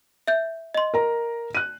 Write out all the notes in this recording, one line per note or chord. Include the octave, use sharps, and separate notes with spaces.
E5 G6
D#5 C6
A#4 A#5
F#6 D#7